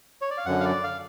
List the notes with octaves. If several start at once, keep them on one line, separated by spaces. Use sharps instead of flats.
C#5
D5
F5
F#2 D3 F#5
F5
D5
F5